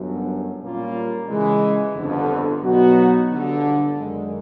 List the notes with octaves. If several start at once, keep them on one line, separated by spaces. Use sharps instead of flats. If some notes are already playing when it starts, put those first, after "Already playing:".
Already playing: G1 F#2 D3 F#3
A#2 G3 A#3 C#4 F4
C#3 E3 G#3
G1 F2 D3
B2 F#3 B3 D#4 F#4
G1 G2 D3
F#2 D#3 G#3